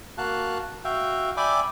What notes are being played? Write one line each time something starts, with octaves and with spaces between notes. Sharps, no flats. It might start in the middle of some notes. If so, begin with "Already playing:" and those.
A#3 F#4 F5 A5 F#6
F#4 E5 F5 G5
D5 E5 G5 G#5 B5 D6